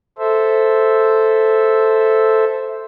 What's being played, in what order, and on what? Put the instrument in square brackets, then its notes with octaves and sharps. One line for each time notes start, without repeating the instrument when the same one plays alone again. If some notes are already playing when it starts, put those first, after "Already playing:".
[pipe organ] A4 C5 E5